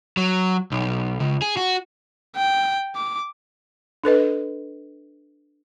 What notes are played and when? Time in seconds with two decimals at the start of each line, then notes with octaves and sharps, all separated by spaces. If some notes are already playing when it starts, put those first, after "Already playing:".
0.17 F#3
0.72 B1
1.20 C#2
1.42 G#4
1.57 F#4
2.36 G5
2.96 D6
4.04 D4 A4 B4 D#5